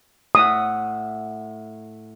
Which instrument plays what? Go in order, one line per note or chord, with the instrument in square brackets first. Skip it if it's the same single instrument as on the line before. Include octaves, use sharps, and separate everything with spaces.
[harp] A2 E5 F#5 [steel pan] D#6